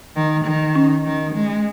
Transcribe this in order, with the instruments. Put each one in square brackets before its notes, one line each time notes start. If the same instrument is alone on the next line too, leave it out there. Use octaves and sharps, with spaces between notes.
[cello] D#3
D#3
[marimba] C#4
[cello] D#3
G#3